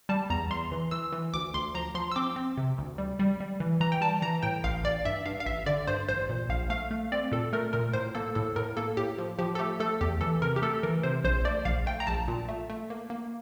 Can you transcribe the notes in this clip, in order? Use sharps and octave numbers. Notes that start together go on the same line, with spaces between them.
G3 A5
E2 A#5
E2 C6
E3
E3 E6
E3
D2 D6
D2 C6
F3 A#5
F3 C6
E6
C4 D6
C4
C3
D2
G3
G3
G3
E3
E3 A#5
G5
G3 A5
E3 A#5
A2 G5
A1 F5
A1 D5
G2 E5
G2 F5
F5
A1 E5
D3 D5
G2 C5
A1 C5
A#2
A#1 F5
A3 F5
A3
C4 D5
A#2 A4
A3 A#4
A#2 A#4
A2 C5
A#3 A4
A2 A4
A2 A#4
A#3 A4
A2 G4
F3
F3 G4
A4
A3 G4
A3 A4
E2 G4
E3 A4
C3 A#4
G4
A3 A4
E3 A#4
C3 C5
A#1 C5
A3 D5
A#1 F5
A3 G5
A#5
A#1 A5
A#2
A3
A3
A#3
A#3